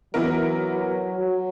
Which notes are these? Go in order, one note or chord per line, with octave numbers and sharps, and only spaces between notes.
E3 F#3 B3 E4 A#4
F#3